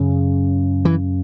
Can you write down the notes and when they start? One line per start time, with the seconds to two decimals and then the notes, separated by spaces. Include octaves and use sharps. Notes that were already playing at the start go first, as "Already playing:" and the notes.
Already playing: F#2 C#3
0.85 E3